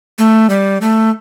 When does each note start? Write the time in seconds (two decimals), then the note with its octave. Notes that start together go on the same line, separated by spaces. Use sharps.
0.19 A3
0.50 G3
0.81 A3